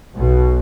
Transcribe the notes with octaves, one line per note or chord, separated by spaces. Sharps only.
B1 B2